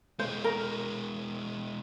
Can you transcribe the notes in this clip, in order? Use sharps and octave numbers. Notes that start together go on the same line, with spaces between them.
B2 G#3 C5
A#4